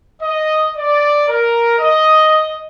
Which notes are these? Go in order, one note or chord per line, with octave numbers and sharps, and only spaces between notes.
D#5
D5
A#4
D#5